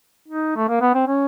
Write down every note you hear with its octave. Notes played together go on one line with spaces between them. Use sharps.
D#4
A3
A#3
B3
C4
C#4